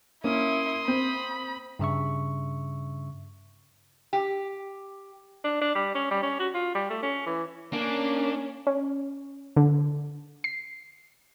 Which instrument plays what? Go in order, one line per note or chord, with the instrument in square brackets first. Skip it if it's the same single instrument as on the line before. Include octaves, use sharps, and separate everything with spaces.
[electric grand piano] A#3 [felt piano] C#4 [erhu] E4 [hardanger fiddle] C6 D#6
[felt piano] C4 [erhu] B5
[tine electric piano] G2 C#3 E5 C#6
[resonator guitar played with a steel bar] G4
[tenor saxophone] D4
D4
G3
C#4
G3
C#4
F#4
F4
G3
A3
C#4
E3
[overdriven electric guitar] A#3 [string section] C#4 [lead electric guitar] D4
[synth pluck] C#4
D3
C7